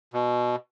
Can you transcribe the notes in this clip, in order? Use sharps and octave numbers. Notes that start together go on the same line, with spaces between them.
B2